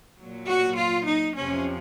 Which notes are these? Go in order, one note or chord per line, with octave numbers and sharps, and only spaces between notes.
A#2 F#3
F#4
F4
D#4
F2 C3 F3 C#4